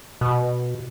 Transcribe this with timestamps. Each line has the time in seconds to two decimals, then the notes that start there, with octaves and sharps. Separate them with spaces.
0.21 B2